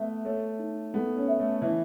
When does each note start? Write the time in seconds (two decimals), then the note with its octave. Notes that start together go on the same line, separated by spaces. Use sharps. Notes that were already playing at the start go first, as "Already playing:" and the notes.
Already playing: A3 B3 E5
0.25 A3 C#5
0.59 D#4
0.94 B3 A4
1.16 C#4
1.28 E5
1.40 A3
1.62 E3 E5